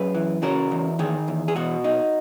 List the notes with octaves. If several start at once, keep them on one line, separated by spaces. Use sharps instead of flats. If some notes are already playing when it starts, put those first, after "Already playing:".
Already playing: F#2 G#4 B4
E3
C#3 F#4 A#4
E2
D#3 G#4
E2
G#4
B2 F#4
D#4